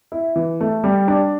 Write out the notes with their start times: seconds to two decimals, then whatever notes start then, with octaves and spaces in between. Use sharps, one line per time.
0.12 E4
0.36 E3
0.61 A3
0.84 G3
1.08 D4